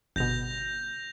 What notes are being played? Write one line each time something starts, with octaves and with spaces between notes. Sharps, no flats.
G1 B2 G6 A#6 F7